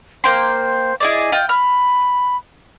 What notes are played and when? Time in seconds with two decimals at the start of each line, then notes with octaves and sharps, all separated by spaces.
0.24 A#3 C5 G5 C6
1.00 E4 G#4 D5 D#5
1.32 F4 G5
1.49 B5 F6